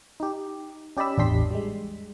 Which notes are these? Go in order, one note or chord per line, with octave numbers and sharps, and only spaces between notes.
D#4 G4
C#4 G4 D5 D#5 B5 E6
A1 E2 D4 G4 C6 B6
G3 G#3